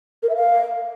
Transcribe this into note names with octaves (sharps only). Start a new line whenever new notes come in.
A#4
E5
F5